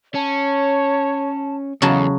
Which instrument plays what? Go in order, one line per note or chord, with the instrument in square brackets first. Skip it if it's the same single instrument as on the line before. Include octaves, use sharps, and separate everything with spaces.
[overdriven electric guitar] C#4 [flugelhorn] C#5 [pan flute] A5
[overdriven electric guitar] E2 [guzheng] C#3 F#3 A5 [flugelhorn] A3